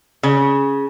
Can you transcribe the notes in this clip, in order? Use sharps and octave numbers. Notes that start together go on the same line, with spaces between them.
C#3